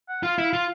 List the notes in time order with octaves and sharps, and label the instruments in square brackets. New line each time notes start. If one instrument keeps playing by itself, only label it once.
[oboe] F#5
[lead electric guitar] F4 [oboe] F5
[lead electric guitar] E4
F4